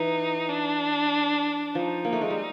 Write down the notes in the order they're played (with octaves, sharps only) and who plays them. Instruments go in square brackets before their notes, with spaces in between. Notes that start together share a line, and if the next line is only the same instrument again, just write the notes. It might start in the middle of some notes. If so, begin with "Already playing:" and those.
Already playing: [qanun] E3 [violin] D#4
[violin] D4
[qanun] F3 [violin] D#4
[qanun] A#3
A3
G#3
G3